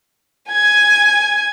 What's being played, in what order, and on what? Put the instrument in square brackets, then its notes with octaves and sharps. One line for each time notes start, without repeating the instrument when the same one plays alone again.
[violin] G#5 G#6